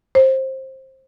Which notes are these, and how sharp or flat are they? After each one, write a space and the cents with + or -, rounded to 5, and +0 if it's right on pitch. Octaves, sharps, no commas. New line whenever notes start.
C5 +20